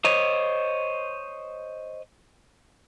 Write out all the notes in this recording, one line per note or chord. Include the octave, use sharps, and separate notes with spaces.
C5 C#5 D#5